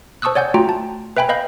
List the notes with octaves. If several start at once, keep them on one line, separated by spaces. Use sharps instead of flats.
C5 A5 C#6 D#6 E6 F#6
C#5 D5 F#5 G#5 G6
A3 F4 F#4 G5 A#5
A5
B4 E5 G5 G#5 B5
B4 D#5 F5 B5 G6